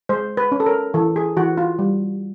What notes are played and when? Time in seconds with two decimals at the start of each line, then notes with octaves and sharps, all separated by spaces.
0.09 G#3 C5
0.37 B4
0.52 C#4
0.60 A4
0.66 A#4
0.94 E3 A4
1.16 G#4
1.37 E3 F#4
1.58 F4
1.79 G3